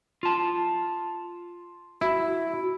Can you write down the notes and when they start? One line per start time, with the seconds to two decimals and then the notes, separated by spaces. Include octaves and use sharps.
0.23 F4 A5
2.01 E4 F#4